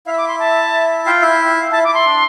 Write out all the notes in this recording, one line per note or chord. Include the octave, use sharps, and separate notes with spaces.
E4 E5 F5
E6
D6
C6
A5
F4 F5 G5
E4 E5
F5
E4 E5 A5
E4 E5 D6
C6
D4 D5